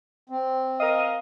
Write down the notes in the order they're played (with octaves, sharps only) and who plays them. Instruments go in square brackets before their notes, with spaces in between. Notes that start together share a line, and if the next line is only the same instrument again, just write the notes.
[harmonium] C4
[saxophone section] A#4 D#5 [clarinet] F5